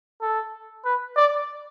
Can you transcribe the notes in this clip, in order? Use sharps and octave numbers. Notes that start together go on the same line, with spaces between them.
A4
B4
D5